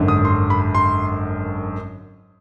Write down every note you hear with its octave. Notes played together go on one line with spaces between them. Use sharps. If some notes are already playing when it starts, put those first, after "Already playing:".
Already playing: G#1 F#2 D3
D#6
C6
B5
C6